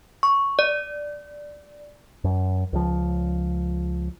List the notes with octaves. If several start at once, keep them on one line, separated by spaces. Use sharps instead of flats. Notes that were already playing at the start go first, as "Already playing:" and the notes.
C#6
D5
F#2
C#2 F3